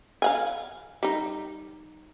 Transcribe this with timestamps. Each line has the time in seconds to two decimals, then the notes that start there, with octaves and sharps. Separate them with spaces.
0.22 F5 F#5 G#5
1.03 G3 D#4